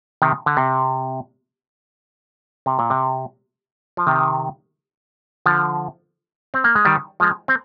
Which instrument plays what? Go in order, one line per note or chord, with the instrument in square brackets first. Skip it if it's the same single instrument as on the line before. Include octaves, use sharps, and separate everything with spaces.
[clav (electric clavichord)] C3 D#3
D3
C3
C3
A#2
C3
F3
C3 D#3
D3 F3
C4
A#3
G#3
D#3 G3
F3 G#3
C4